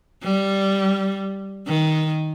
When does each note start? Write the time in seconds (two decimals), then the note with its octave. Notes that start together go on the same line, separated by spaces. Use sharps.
0.23 G3
1.67 D#3